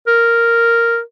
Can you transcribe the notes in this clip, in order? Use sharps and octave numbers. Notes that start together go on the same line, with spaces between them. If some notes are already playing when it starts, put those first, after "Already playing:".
A#4